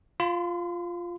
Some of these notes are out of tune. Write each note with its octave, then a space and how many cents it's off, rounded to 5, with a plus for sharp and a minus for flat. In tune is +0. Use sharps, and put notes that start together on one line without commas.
F4 +0 C6 -45